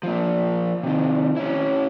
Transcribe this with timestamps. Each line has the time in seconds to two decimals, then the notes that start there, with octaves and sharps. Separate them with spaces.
0.03 F3 A#3
0.83 C3 D#3
1.37 C#4 E4